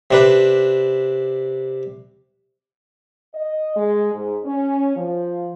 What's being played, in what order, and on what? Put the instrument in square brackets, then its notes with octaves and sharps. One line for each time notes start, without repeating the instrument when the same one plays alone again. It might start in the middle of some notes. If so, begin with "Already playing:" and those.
[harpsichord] C3 D4 B4
[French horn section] D#5
G#3
G#2
C#4
F3